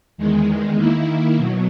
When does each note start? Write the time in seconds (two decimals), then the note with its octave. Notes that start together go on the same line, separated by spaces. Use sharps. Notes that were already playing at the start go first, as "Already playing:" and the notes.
0.18 E2 D#3 G#3
0.78 D#3 A#3 E4
1.37 B2 F#3